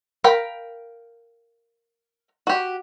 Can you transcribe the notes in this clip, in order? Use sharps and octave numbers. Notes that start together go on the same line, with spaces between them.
A#4 F5 G5 B5
F#4 G4